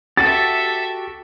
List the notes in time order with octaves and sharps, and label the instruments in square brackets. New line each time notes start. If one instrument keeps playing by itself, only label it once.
[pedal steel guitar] F#4 G4 [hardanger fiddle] A4 E5 [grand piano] A6